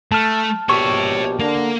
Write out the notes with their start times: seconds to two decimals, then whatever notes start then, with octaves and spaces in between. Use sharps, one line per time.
0.12 A3 A5 F6
0.69 A#1 B2 G4 C#5 E5 C#6
1.40 D3 A#3 A#4